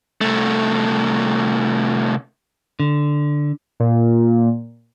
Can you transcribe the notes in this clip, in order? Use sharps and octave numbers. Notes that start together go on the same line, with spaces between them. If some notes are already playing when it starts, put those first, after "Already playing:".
C2 A3
D3
A#2